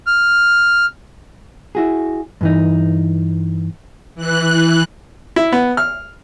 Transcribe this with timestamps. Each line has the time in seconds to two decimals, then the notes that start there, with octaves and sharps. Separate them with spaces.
0.07 F6
1.75 E4 F#4 G#4
2.41 G2 E3 D#4
4.15 E3 F#6
5.36 E4
5.53 B3
5.77 F6